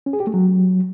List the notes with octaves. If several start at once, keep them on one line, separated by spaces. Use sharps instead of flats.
C#4
G#4
G4
A3
F#3